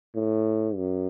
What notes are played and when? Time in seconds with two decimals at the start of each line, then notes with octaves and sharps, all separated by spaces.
0.15 A2
0.76 F#2